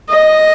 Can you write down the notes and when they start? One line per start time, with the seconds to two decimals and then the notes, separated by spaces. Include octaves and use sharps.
0.09 D#5